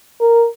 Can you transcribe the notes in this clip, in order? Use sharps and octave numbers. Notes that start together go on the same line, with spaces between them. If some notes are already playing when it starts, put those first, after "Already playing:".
A#4